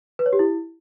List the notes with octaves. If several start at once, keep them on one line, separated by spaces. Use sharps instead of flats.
B4
C#5
G4
E4